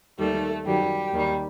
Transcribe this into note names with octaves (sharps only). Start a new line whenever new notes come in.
D#2 D#3 G3 A3 A4
F#2 D#3 F#3 G3 G4
D#2 D#3 G3